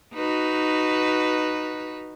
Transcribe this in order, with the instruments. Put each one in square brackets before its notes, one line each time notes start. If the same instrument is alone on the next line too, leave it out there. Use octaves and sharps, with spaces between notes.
[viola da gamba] D#4 F#4 B4